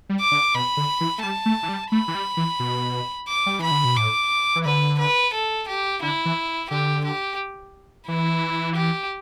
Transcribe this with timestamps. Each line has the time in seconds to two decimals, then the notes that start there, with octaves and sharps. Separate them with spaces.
0.09 G3
0.20 D6
0.31 D3
0.55 B2 B5
0.77 D3
1.01 E3
1.18 A3
1.22 G3 A5
1.46 A3
1.63 E3
1.69 G3
1.92 A3 B5
2.08 E3
2.15 G3
2.37 E3
2.60 B2
3.28 D6
3.46 G3
3.59 E3 B5
3.71 D3
3.85 B2
3.97 A2 D6
4.56 E3
4.65 D3 B4
4.99 B4
5.33 A4
5.68 G4
6.02 D3 E4
6.25 E3
6.70 D3 G4
7.05 G4
8.07 E3 E4
8.76 G4